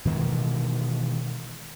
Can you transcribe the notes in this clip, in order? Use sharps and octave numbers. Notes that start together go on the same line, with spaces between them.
B2 D#3 E3 G#3